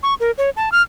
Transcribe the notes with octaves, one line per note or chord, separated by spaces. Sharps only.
C#6
A#4
C#5
A5
F6